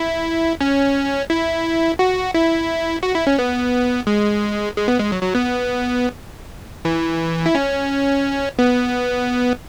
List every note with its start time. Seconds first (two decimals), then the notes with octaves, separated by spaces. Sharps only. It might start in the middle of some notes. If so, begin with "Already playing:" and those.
Already playing: E4
0.61 C#4
1.30 E4
1.99 F#4
2.34 E4
3.03 F#4
3.15 E4
3.27 C#4
3.39 B3
4.07 G#3
4.77 G#3
4.88 B3
5.00 G#3
5.12 F#3
5.23 F#3
5.35 B3
6.85 E3
7.46 E4
7.55 C#4
8.59 B3